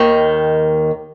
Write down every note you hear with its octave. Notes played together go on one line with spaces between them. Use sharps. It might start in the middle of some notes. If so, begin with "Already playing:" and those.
Already playing: D#2 D#3